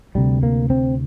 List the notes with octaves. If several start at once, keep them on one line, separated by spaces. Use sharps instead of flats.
D2 C3 G3
A#3
C4